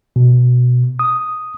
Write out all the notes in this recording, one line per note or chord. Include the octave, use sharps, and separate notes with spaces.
B2
D#6